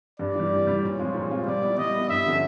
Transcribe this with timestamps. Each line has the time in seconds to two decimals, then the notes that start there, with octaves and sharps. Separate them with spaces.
0.19 G2 D5
0.35 E3 G3
0.51 G2
0.67 E3 G3
0.83 A#2 C#5
0.98 F3 G#3 C4 F4
1.14 A#2
1.30 F3 G#3 C4 F4
1.46 G3 D5
1.62 B3 E4
1.78 G3 D#5
1.94 B3 E4
2.09 G2 E5
2.26 D3 F3 A3 C#4